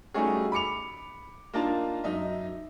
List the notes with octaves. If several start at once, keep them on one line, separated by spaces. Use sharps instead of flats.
G3 A3 C#4 D#4 F#4 G#4
B5 D6 C#7 F7
A#3 D4 D#4 F4 A5
F#2 D#4 D#5 E5